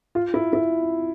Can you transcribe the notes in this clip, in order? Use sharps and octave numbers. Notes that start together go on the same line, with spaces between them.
F4
E4
E4